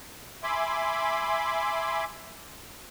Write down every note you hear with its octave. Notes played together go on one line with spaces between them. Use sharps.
E5 G#5 B5 C6 D6